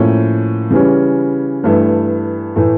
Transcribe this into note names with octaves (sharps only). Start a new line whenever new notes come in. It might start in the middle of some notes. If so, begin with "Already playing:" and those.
Already playing: A2 F3 A#3 C#4
C#3 E3 G3 C#4
G2 E3 A3
A2 E3 A3